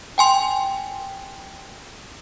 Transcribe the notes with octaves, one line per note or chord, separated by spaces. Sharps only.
G5 G#5 C6